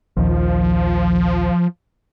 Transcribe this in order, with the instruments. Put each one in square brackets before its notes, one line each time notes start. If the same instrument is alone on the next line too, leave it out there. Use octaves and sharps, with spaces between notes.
[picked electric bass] A#1 D#2 [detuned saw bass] F3